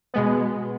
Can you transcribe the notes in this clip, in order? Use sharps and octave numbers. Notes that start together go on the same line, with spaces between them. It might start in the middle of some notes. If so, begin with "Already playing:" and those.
B2 G#3 B3